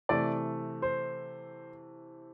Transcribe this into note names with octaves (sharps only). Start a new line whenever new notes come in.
C3 E3 A3 D5
C5